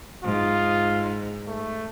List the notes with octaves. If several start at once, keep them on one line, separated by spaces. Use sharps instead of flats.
G#2 F4
A3